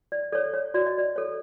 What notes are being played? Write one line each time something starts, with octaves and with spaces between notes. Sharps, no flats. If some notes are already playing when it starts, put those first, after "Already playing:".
D5
A4 C#5 D5
C#5
F#4 D5
D#5
D5
A4 C#5